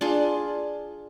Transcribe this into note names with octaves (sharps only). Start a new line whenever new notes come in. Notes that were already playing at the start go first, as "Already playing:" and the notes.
D4 F4 G#4